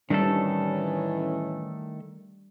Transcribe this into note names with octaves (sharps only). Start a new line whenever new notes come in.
A2 D#3 E3 G3 A3 C#4 D4 A4